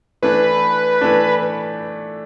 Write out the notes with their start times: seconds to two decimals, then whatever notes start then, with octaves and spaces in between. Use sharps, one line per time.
0.22 E3 A3 D4 B4
1.01 E3 A3 D4